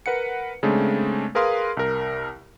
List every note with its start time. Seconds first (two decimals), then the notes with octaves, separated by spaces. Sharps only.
0.06 A#4 B4 F#5 C#7
0.63 C#3 G#3 A3 C4 D4
1.35 G#4 A#4 B4 F5 C6 D#6
1.77 C2 A#4